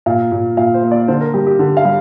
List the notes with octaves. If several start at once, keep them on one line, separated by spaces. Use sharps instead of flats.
A#2 F5
A#2
A#2 F5
C5
A#3
D5
D3 C5
A#4
G3 G4
G4
D3
F5
G3